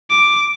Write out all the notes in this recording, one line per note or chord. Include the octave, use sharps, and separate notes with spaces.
D6